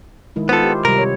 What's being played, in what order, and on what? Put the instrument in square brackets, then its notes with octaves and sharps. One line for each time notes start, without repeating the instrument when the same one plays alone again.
[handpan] D#3 G#3 E4
[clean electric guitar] B3 A4 [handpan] F4 C5
[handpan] G4
[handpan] C3 G3 [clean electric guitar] A#4
[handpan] C#5